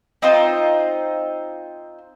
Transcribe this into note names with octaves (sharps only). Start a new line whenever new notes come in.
C4 D#4 F4 C5